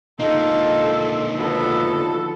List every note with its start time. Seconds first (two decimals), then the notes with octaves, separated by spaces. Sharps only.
0.20 D3 A#3 D#4 F4 A4
1.38 D#3 F3 B3 F#4 A4